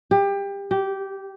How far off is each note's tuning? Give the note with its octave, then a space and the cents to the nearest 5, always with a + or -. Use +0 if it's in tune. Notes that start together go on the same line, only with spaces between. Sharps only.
G4 +25
G4 -15